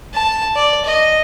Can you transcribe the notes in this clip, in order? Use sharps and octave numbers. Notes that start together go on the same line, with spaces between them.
A5
D5
D#5